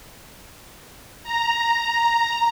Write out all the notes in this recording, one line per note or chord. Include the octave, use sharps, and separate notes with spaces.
A#5